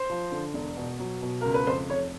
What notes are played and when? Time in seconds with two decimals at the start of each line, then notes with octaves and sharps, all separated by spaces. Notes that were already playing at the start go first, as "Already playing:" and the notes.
Already playing: C5
0.10 F3
0.32 D3
0.54 E1
0.77 B2
0.99 F#3
1.22 B2
1.41 C#2 A#4
1.54 B4
1.67 F2 C5
1.90 F1 C#5